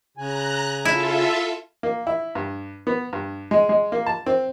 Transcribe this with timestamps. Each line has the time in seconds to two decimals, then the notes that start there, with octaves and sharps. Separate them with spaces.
0.17 C#3 G#5 A#5 F#6
0.85 E4 F4 A4 E5
1.83 A#3
2.07 E4
2.35 G2
2.87 B3
3.13 G2
3.51 G#3
3.69 G#3
3.92 A#3
4.06 A5
4.26 C4